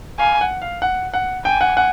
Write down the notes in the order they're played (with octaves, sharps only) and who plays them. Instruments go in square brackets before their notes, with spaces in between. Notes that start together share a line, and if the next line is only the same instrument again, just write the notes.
[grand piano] F5 [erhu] G#5
[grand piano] F#5
F5
F#5
F#5
[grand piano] G5 [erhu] G#5
[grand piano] F#5
F#5